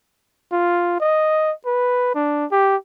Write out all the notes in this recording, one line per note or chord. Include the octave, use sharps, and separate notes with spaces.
F4
D#5
B4
D4
G4